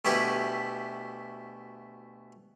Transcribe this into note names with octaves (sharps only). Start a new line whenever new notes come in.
D2 B2 E4 G4 B4